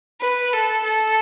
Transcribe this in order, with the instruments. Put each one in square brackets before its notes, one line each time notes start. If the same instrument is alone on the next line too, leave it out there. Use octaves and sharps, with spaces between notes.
[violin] B4
A4
A4